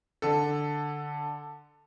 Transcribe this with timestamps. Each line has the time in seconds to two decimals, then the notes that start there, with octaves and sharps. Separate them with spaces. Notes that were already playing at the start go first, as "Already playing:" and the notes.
0.22 D3 A4